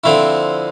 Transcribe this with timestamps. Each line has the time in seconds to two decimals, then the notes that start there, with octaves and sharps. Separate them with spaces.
0.04 D3 F3 C4 E4